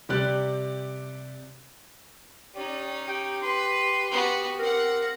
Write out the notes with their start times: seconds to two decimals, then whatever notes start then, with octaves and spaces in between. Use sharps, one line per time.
0.09 C3 G3 G4 D5 F#6
2.55 C#4 D#4 G4 D5
3.08 G4 G5
3.42 B4 C6
4.11 B3 F#4
4.59 C4 A#4 F#5